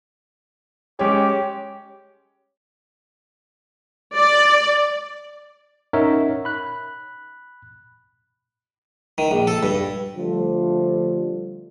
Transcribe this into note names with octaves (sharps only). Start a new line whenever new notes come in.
G#3 C#4 G4 C#5
D5
C#4 D#4 A#4 C#5 E5 F#5
B5 F#6
D#3
A#1
A4
G2
D3 F3 G3 A3